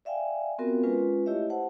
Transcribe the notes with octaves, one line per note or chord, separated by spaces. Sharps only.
D5 E5 F5 G5 G#5
B3 C4 F4 F#4 A#4
G#3 C#4 F4 B4
A3 E4 G4 C#5 D#5 E5
C5 F#5 A5